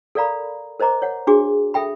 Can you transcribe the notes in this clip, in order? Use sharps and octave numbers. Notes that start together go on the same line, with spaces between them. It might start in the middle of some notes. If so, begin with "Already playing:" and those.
A4 A#4 D5 F5 A#5 B5
A#4 C5 D#5 A#5 D6
C#5 F#5
D4 F#4 G#4 D6
A4 E5 G5 B5